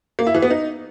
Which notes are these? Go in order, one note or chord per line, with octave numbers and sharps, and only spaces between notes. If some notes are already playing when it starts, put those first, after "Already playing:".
A#3
E4
E3
B3
D#4